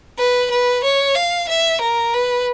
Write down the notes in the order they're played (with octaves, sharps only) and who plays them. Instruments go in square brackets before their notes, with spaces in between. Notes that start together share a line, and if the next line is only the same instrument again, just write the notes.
[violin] B4
B4
C#5
F5
E5
A#4
B4